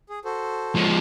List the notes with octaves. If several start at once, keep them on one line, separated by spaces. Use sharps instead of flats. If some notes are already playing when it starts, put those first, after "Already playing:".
G#4
F#4 A4 C5
F3 G#3